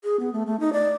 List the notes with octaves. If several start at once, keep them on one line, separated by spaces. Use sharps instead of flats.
G#4
B3
A3
A3
D#4
D5